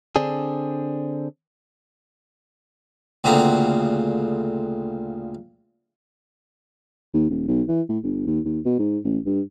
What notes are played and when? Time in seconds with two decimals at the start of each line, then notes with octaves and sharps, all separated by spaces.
0.16 D3 C4 D4 G#4
3.24 D2 A#2 C#3 B3 C4 A#5
7.14 D#2
7.30 D#1
7.48 B1
7.68 E3
7.89 A2
8.03 G1
8.26 D#2
8.45 D#2
8.65 B2
8.79 G#2
9.04 A1
9.26 G2